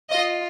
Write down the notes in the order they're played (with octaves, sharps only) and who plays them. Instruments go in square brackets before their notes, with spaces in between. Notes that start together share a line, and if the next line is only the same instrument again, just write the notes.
[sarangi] F4 [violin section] D#5